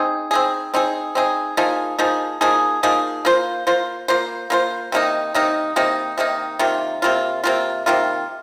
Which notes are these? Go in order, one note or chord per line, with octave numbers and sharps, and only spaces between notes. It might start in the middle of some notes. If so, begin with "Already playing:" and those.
Already playing: C4 D#4 G#4
C4 D#4 G#4
C4 D#4 G#4
C4 D#4 G#4
F3 A#3 D#4 G#4
F3 A#3 D#4 G#4
F3 A#3 D#4 G#4
F3 A#3 D#4 G#4
A#3 F4 C5
A#3 F4 C5
A#3 F4 C5
A#3 F4 C5
C3 D#3 A#3 D#4
C3 D#3 A#3 D#4
C3 D#3 A#3 D#4
C3 D#3 A#3 D#4
C3 D#3 A#3 F4
C3 D#3 A#3 F4
C3 D#3 A#3 F4
C3 D#3 A#3 F4